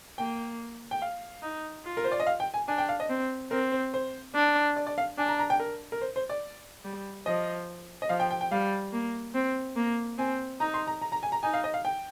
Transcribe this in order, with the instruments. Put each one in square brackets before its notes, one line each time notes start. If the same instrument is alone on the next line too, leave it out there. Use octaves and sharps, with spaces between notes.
[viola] A#3 [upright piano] G5
[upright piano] G5
F5
[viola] D#4
F4
[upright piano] A#4
C5
D5
D#5
F5
G5
G#5
[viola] D4 [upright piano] G#5
[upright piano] G5
F5
D#5
[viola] C4
[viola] C4 [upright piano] A#4
[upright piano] C5
C5
[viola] D4
[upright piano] D5
D5
F5
[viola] D4 [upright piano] G#5
[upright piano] A#5
A#5
G5
A#4
A#4
C5
C5
D5
[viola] G3
[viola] F3 [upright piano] D#5
[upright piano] D#5
[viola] F3 [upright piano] F5
[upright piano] G5
G5
G5
[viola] G3 [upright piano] F5
[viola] A#3
C4
A#3
[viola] C4 [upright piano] G#5
[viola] D#4 [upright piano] A#5
[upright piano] C6
A#5
A#5
A#5
G#5
A#5
[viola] D#4 [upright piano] G#5
[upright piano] F5
D#5
F5
G5